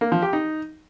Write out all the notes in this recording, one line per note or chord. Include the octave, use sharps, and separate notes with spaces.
A#3
F3
G4
D#4